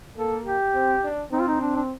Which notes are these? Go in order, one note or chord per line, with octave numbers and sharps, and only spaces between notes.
A#3 A4
G4
C4
D4
C4 D#4
F4
D#4
D4
D4